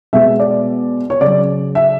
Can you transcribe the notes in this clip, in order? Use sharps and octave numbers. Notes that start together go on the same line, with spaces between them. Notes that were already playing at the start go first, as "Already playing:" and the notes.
B2 G#3 E5
D5
C#5
C#3 F#3 D5
E5